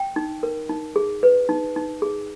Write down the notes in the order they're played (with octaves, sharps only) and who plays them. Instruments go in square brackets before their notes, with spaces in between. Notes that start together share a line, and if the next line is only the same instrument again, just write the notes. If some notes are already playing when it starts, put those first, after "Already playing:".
Already playing: [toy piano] G5
D#4
A#4
D#4
G#4
B4
D#4
D#4
G#4